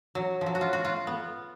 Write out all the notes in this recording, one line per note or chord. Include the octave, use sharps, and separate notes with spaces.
F#3
F3
F#3
F#4
F4
F#4
F4
B3